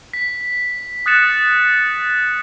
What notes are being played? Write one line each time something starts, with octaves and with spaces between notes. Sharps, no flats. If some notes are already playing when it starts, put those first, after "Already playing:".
B6
D#6 F#6 A6 C#7 E7